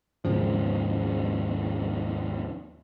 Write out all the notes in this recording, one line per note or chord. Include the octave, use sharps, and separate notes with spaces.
D#2 G#2 C#3 F3